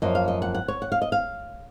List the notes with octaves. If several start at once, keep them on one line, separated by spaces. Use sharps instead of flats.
F#2 F3 A#3 D#5
F5
D#5
F#5
F#5
C#5
F#5
F5
D#5
F5